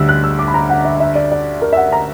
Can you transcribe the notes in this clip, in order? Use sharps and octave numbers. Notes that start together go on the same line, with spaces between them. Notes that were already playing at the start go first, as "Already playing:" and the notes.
Already playing: D2 D3 G3 E6
F#6
E6
D6
B5
A#5
F#5
E5
E5
D5
D5
A#4
E5
F#5
A#5